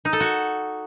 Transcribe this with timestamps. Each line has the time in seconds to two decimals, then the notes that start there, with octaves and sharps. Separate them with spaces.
0.05 D#4
0.13 A4
0.20 F#4